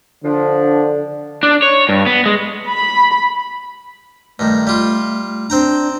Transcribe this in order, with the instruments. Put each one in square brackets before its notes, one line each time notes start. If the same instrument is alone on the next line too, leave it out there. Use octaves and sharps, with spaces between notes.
[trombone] D3 [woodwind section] F3 D4
[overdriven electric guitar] D4
C#5
G2
B3
G#3
[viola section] B5
[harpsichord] G2 D#3 [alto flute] A3
[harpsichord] G3 F4
[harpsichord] C4 G5 A#5 [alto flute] D4